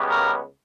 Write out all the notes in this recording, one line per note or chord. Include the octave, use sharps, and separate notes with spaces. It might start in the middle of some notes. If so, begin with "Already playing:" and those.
Already playing: C#2 C#3 G3 B3
A#4